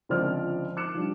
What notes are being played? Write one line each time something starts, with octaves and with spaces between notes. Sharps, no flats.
C#2 D3 F3 C4 D5 F6
D6 F#6 C#7 E7
F3 G3 D4